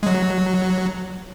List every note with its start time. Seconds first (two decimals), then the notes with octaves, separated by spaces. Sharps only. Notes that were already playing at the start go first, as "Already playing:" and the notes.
0.03 G#3
0.07 F#3